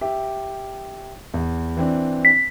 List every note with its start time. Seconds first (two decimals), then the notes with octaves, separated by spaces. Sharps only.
0.01 G4 E5
1.34 E2
1.77 E3 C4 D4
2.25 B6